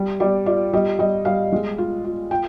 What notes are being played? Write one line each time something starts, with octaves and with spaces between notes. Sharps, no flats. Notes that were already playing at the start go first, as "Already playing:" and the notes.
Already playing: G3
G3 D5
F4 D5
G3 D#5
G3 D#5
G3 F5
G#3
F4
F4
F4 G5